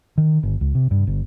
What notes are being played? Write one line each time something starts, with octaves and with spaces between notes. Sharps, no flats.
D#3
G1
C#2
C3
G2
G1